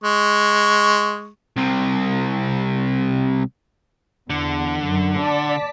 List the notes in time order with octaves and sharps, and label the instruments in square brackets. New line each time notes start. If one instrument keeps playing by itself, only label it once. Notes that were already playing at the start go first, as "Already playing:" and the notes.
[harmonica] G#3 C#6
[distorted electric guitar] C2 C3
[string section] E2 [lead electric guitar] D3
[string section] F#2
D5 A5 B6